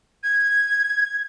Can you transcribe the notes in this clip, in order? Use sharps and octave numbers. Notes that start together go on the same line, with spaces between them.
G#6